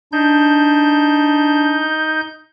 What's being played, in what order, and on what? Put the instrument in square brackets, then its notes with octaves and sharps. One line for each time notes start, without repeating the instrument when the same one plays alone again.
[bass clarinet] D4 [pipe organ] D#4 G6